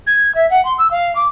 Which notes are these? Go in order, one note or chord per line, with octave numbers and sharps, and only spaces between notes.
G#6
E5
F#5
C6
E6
F5
D6